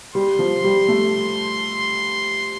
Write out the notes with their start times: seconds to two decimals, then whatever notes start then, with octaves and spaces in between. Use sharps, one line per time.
0.15 G3 C6
0.39 F3
0.64 G3
0.88 A3